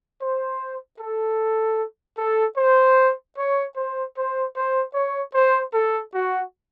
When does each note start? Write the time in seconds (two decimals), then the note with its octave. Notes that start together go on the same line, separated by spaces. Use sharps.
0.21 C5
0.99 A4
2.18 A4
2.57 C5
3.37 C#5
3.77 C5
4.17 C5
4.56 C5
4.95 C#5
5.35 C5
5.74 A4
6.14 F#4